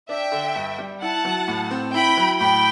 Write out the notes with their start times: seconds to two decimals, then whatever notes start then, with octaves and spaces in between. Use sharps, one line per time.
0.09 D4 E5 G5
0.32 D3
0.55 G2
0.79 G3
1.02 E4 F#5 A5
1.25 F#3
1.48 A2
1.71 C4
1.94 E4 G5 B5
2.17 F#3
2.40 A2 G5 B5